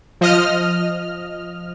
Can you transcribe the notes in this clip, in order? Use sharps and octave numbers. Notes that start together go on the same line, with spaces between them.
F3 D#5 F6